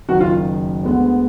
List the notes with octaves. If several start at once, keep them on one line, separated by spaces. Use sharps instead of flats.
F#1 F#2 D#3 F#4
F4
D2 D3 G#3 B3